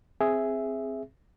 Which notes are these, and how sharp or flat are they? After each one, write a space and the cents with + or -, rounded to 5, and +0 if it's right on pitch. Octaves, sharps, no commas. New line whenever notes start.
C4 +0 G#4 +0 E5 +0